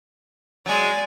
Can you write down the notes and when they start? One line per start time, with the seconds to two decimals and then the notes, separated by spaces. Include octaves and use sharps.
0.66 F#3 G#3 D5 G#5